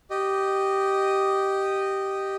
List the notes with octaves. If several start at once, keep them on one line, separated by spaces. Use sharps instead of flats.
G4 D#5